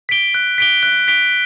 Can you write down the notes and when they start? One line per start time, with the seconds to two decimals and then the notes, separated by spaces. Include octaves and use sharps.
0.09 B6 D7 G7
0.34 F#6
0.58 B6 D7 G7
0.83 F#6
1.08 B6 D7 G7